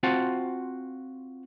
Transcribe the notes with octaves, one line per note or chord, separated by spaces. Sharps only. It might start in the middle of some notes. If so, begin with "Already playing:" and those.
C4 F4 F#4 C5 F#5 A5